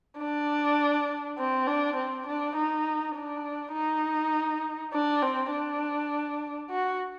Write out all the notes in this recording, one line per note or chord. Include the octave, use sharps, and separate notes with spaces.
D4
C4
D4
C4
D4
D#4
D4
D#4
D4
C4
D4
F#4